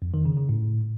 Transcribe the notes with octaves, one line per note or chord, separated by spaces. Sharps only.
F2
D#3
C#3
C#3
A2